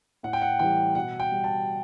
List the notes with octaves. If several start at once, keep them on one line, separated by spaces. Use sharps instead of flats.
A2 F#5
G5
F#5
E3 G3 G5
B2 F#5
G5
G3
A5